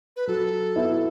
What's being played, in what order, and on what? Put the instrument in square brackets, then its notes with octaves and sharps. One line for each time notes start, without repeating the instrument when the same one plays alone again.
[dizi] B4
[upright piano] F#3 [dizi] A4
[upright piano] B3 E4